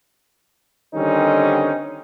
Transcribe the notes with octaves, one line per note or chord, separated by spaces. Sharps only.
D3 D#3 G3 C4 C#4 D#4